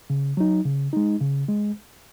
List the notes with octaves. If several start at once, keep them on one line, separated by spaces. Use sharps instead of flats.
C#3
F#3 D#4
C#3
G#3 D#4
C#3
G#3